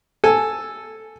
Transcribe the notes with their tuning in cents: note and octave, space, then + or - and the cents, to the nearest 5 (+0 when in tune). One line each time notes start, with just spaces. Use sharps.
A4 +0 G#5 +0